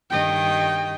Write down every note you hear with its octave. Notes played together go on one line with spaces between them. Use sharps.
G2 D#3 D#5 G5